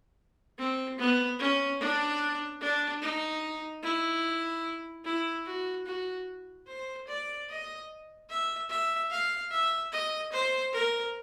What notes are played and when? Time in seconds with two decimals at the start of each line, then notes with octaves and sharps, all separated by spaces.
0.59 C4
0.99 B3
1.39 C#4
1.79 D4
2.61 D4
3.02 D#4
3.83 E4
5.05 E4
5.46 F#4
5.86 F#4
6.67 C5
7.07 D5
7.49 D#5
8.29 E5
8.70 E5
9.11 F5
9.51 E5
9.92 D#5
10.32 C5
10.72 A#4